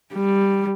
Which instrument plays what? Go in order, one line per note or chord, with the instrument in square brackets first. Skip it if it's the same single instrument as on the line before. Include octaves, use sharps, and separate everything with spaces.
[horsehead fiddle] G3